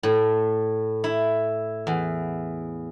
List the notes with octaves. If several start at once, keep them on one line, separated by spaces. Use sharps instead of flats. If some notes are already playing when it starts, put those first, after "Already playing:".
A2
E4
E2